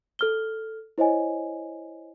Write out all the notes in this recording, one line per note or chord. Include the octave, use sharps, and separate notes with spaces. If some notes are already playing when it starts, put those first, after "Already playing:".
A4 F6 G7
E4 C5 C#5 D#5 G#5